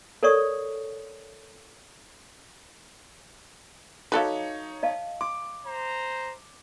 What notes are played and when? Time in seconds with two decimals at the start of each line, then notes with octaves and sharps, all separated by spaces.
0.23 A4 A#4 C#5 D5 C#6 D#6
4.12 F#3 D#4 A4 B4 C#5 F5 A5 D6
4.83 D#5 F5 A5
5.21 C6 D6
5.66 C5 A#5